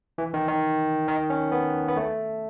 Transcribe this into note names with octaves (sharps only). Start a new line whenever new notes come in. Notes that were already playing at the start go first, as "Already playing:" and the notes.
E3
D#3
D#3
D#3
C#4
B3
B3
A3